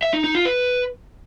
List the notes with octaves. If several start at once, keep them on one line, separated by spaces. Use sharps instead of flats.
E5
D#4
D#4
F4
B4